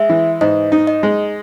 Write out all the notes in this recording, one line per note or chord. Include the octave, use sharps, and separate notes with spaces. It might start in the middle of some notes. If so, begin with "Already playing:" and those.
Already playing: G#3 E5
E3
G#2 D#5
D#4
D#5
G#3